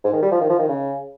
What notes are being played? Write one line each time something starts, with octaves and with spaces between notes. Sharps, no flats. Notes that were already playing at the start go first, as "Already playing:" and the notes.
G#2
D#3
G3
F3
D#3
F3
D#3
C#3